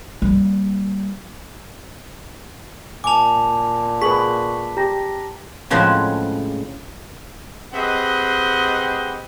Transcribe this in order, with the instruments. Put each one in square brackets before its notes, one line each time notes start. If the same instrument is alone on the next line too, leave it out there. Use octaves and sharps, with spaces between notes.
[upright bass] G3 A#3
[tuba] A#2 [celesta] G#5 F7 [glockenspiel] A5 D6
[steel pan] G#4 B4 [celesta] C#6 F#7 [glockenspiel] B6
[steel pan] G4 [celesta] A#5 A#6
[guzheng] A2 C#3 F3 G#3 C4 F#5
[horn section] C4 G4 G#4 B4 D#5 F#5